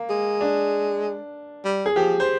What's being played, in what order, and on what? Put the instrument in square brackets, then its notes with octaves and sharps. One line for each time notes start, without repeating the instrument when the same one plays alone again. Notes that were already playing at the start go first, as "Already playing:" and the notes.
Already playing: [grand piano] A#3
[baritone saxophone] G#3
[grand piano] D4
[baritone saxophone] G3
[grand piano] G#4
[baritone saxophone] F3 [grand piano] G4
[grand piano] C5